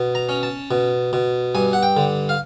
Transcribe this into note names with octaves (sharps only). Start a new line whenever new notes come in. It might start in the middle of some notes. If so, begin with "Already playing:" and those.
Already playing: B2
A#5
C#4
A5
B2
B2
G2 G#5
F#5
G5
D3
F5